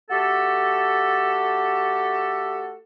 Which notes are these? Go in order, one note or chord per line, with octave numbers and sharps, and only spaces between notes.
A3 F#4 G4 A4